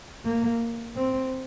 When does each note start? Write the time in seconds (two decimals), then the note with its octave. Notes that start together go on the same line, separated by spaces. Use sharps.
0.25 A#3
0.96 C4